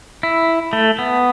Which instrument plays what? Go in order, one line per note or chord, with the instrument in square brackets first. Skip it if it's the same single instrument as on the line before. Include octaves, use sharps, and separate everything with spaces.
[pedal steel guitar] E4
A3
B3